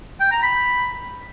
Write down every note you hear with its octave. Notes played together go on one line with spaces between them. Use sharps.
G5
A#5
B5